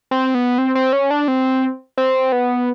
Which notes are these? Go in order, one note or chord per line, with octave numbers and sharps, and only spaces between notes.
C4
B3
C4
C4
C#4
D4
C4
C4
B3